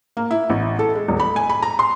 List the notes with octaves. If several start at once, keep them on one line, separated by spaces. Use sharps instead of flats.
A#3
E4
A1
A4
G#3
D#1
B5
G#5
B5
A#5
C6